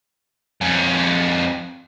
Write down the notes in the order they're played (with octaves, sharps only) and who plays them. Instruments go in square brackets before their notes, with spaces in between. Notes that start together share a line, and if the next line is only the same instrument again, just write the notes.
[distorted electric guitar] F2 C#4